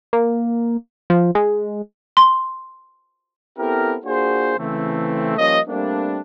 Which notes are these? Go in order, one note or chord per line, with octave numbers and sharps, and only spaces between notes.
A#3
F3
G#3
C6
B3 C4 E4 G4 A4 A#4
A#3 D4 F4 F#4 G#4 C5
C#3 E3 A3 C4
F3 G3 A#3 C#4 D#5
G3 A3 A#3 C4 D4